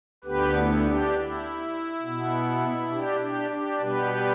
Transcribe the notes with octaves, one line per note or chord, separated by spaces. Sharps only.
D2 D3 B3 G4 B4
E4
D4 G4
E4
B2 B3
D4 G4
D4 G4
D4 G4
B2 G3 B3 G4 B4